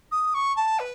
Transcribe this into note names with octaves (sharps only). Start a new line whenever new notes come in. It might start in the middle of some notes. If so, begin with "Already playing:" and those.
D#6
C#6
A5
B4